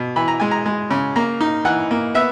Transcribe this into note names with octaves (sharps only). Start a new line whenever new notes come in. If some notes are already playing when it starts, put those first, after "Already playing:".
Already playing: B2
E3 B5
A#5
G#3 G#5
A#5
G#3
C#3
A#3 A#5
D#4
E3 F#5
A#3
B3 E5